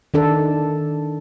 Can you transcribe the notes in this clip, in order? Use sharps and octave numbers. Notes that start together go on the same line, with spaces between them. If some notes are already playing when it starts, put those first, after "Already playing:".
D#3 D4 A4